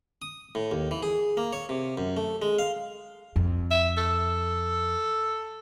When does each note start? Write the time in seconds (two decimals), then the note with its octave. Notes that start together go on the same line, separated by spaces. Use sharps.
0.22 D#6
0.55 A2
0.71 D#2
0.91 E3
1.03 G#4
1.37 A#3
1.53 C#5
1.69 C3
1.97 F#2
2.17 A3
2.42 G#3
2.59 F5
3.36 F2
3.71 E5
3.97 A4